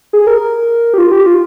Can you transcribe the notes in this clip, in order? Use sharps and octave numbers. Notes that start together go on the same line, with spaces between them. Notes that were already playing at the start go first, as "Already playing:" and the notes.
G#4
A#4
A#4
G4
F4
G4
F4